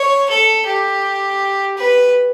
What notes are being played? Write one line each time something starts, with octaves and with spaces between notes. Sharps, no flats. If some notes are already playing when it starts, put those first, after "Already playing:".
Already playing: C#5
A4
G4
B4